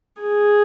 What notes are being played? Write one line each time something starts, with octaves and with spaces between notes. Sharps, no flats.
G#4